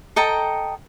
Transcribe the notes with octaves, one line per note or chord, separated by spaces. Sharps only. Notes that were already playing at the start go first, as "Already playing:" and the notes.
A4 D#5 G5 A#5